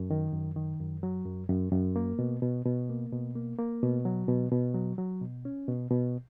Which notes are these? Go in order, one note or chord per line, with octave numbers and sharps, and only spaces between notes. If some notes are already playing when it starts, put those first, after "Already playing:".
Already playing: F#2
D#3
F#2
D#3
F#2
F#3
F#2
F#2
F#2
A#3
B2
B2
B2
A#3
B2
A#3
A#3
B2
F#3
B2
B2
F#3
F#3
B2
C#4
B2
B2